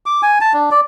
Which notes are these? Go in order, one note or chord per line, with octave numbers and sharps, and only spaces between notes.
D6
G#5
A5
D4
D5